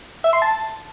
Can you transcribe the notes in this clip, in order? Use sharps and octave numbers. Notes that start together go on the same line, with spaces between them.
E5
C6
A5